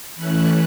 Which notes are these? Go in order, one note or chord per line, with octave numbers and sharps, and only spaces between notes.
E3 A3 C#4 E4 F#6